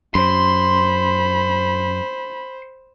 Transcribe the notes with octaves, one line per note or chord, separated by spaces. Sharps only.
F#2 C5 B5 C6